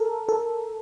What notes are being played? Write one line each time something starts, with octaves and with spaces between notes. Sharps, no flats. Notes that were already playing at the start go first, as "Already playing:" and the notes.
Already playing: A4 A#4
A4